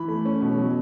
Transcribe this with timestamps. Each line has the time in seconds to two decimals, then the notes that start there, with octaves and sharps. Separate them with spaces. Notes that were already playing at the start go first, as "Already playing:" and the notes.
Already playing: E3 B5
0.08 A3
0.25 C#4
0.41 B2
0.58 F#3